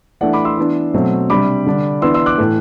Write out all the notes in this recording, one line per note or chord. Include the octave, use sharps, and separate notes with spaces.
E3 A3 D4 D5 F#5
B5 D6
C6 E6
E3 B3 D4
B2 F#3 A3 C4
C3 G3 D4 B5 D6
D3 G3 D4
E3 B3 D4 C6 E6
C6 E6
D6 F#6
A2 E3 A3